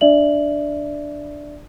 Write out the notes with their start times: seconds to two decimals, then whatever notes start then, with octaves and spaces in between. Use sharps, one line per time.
0.01 D4 D5 E5 F#7